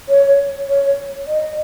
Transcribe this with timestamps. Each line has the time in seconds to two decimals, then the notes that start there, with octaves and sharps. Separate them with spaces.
0.09 C#5
0.68 C#5
1.27 D#5